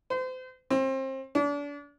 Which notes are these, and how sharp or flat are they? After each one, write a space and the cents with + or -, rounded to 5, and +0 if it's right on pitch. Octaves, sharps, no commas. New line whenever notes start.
C5 -35
C4 +30
D4 -35